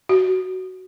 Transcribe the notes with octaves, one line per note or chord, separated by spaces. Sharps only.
F#4